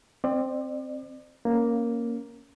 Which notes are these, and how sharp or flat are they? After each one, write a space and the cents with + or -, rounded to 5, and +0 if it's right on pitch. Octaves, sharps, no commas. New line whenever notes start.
C4 +0 D5 +35
A#3 +0 C#4 +0